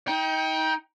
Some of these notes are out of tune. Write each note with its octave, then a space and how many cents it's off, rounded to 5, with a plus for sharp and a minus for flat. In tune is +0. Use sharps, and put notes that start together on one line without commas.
D#4 +35 G5 +0